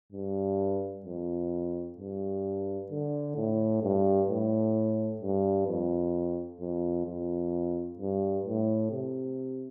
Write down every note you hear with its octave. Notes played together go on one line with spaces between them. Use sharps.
G2
F2
G2
D3
A2
G2
A2
G2
F2
F2
F2
G2
A2
C3